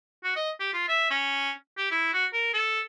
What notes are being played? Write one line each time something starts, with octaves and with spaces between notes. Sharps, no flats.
F#4
D#5
G4
F4
E5
C#4
G4
E4
F#4
A#4
A4